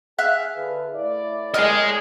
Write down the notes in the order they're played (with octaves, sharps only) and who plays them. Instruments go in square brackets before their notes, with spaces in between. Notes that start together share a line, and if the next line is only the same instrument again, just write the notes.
[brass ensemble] G#4 [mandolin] E5 F5 F#6
[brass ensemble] D3 G#4 B4
A2 E4 D5
[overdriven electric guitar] G#4 D#5 [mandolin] A#4 C#5 G5